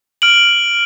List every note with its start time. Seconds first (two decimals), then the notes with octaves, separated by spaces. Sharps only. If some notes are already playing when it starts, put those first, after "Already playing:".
0.22 F6 D7 F#7